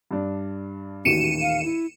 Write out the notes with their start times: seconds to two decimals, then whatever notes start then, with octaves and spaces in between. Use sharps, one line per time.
0.11 G2 D4
1.05 D#1 A1 D#3 F#4 C#7 D#7 E7
1.42 F5
1.64 E4